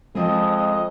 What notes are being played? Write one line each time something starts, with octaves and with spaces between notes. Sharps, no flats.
F2 F3 G#3 C4 G#4 D#5